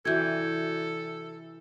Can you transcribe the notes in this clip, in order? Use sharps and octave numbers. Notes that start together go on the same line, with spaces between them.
C3 E3 F#4 A4 D5 G6 G#6